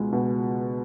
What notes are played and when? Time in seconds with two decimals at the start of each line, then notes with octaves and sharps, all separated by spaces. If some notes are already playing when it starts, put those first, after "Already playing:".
Already playing: C#2 B2 G#3
0.13 B2